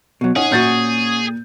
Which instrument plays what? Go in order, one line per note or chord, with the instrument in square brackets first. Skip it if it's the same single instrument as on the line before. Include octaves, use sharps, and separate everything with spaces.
[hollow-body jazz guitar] B2 F#3
[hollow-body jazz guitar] C#4 [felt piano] D#4 F#5 [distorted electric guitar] G#4
[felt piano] A#2 G6 A6 [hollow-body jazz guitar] C#4 F#4